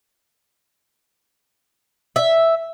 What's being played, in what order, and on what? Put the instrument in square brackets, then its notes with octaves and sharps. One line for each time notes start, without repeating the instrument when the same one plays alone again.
[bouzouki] E5